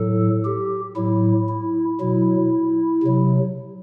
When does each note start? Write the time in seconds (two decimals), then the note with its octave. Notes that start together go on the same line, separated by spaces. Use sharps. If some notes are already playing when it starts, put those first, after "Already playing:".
Already playing: A2 F#3 A4
0.45 G4
0.96 A2 F#3 E4
1.49 E4
2.00 B2 F#3 E4
3.03 C3 F#3